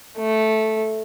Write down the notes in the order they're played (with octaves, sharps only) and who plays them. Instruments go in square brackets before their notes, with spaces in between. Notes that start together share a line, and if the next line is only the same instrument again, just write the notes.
[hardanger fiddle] A3